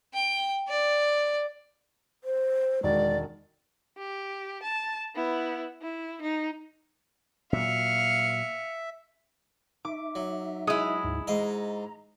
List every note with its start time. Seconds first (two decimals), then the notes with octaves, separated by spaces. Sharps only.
0.14 G5
0.68 D5
2.24 C5
2.83 E1 D#3 G#3 F#4 D5
3.97 G4
4.62 A5
5.15 B3 E4
5.82 E4
6.22 D#4
7.53 A#2 F#3 E5 F5 C#7
9.85 D#4 E5 D6
10.15 F#3
10.67 G#3 E4 D#6
11.03 D2 G#2 D#4
11.27 G#2 D#5 A#5